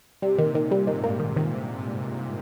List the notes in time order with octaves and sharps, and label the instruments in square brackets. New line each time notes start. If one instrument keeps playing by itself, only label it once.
[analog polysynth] C3 [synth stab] G3
[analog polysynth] A#2 [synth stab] D#3
[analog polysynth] C3
[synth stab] D#3
G3
[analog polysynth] G#2 [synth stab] D#3
[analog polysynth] G2 [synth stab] A#3
[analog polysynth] G2
[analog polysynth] G#2 [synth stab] D#3
[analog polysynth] C3 [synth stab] D#3